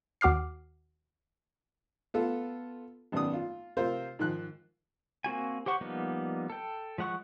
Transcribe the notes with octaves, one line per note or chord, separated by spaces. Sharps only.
D#2 F#4 D6 F6 C7
B3 F4 A4
G#1 F#2 B3 D5 D#6
F4
C3 C4 F4 A#4 C5
G#2 D#3 F3 F#6
A#3 C4 F#4 G#5
G4 C5 F#5 C#6
F3 G3 A#3 B3 D#4
A4 G5
F3 G#3 F#5 C#6 F#6